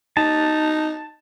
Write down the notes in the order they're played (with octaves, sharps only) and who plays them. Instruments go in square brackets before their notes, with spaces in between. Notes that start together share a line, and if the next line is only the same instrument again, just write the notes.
[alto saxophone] D#4 [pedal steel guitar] A5